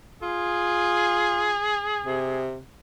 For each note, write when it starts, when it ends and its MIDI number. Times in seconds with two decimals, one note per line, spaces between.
0.22 1.53 65
0.22 2.41 68
2.05 2.59 48